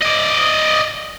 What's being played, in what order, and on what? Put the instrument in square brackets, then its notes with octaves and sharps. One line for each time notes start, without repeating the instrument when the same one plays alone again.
[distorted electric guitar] D5 D#5